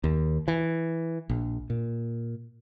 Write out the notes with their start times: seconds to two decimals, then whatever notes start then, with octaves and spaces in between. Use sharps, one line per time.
0.04 D#2
0.48 E3
1.29 A#1
1.70 A#2